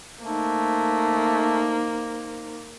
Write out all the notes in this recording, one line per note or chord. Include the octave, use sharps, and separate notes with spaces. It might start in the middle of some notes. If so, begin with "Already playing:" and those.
A3 A#3 D#4 C5